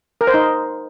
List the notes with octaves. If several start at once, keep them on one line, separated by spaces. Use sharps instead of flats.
A#4
C5
D#4